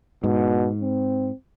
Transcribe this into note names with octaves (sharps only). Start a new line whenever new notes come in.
G#2 B2
C4